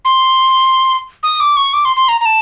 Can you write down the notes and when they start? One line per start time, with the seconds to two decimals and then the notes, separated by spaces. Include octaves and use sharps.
0.05 C6
1.23 D#6
1.40 D6
1.56 C#6
1.73 D6
1.85 C6
1.96 C6
2.08 A#5
2.20 A#5
2.25 A5